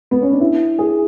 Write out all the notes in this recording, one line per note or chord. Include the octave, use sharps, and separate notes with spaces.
B3
C#4
D4
E4
G#4